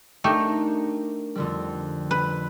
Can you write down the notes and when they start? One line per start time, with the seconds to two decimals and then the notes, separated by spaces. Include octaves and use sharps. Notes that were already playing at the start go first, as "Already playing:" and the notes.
0.24 A3 D4 D#4 G4 A#4
1.35 F2 D3 G3
2.11 B4